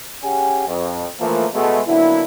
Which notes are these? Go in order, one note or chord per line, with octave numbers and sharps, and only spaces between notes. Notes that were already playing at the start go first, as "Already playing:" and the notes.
C#4 G4 G#4 F#5 G#5
F2
E3 F3 A3 A#3
B2 G#3 A3 B3
D3 F#3 A#3 B3 E4